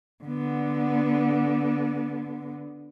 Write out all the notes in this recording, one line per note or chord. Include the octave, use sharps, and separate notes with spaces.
D3 B3